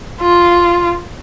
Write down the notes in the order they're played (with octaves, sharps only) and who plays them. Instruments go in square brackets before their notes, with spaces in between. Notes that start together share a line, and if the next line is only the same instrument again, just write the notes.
[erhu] F4